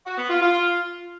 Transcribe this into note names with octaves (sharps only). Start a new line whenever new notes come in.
F#4
B3
F4
F4